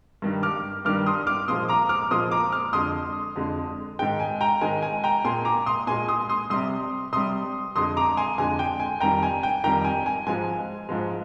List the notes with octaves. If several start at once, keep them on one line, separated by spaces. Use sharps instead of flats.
G2 D#3 G3
D6 F6
G2 D#3 G3 D6 F6
C6 D#6
D6 F6
A#2 F3 G#3 C6 D#6
A#5 D6
D6 F6
A#2 F3 G#3 C6 D#6
A#5 D6
D6 F6
F2 D3 G#3 C6 D#6
F2 D3 G#3
G#2 D#3 G#3 G5
G#5
G5 A#5
G#2 D#3 G#3 G#5
G#5
G5 A#5
A#2 G#3 G#5 C6
A#5 D6
C6 D#6
A#2 G#3 G#5 C6
C6 D#6
C6 D#6
C3 G3 C6 D#6
C3 G3 C6 D#6
F2 D3 G#3 C6 D#6
A#5 D6
G#5 C6
F2 D3 G#3 G#5
G5
G#5
F2 D#3 G3 G5 A#5
G#5
G5
F2 D#3 G3 G5 A#5
G#5
G#5
G#2 F3 G#3 G#5
G#2 F3 G#3